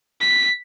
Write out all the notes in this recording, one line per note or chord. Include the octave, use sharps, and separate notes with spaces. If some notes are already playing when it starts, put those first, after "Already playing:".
B6